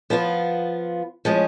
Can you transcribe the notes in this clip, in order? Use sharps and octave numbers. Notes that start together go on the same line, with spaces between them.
F3 B3 F4
F3 G#3 C#4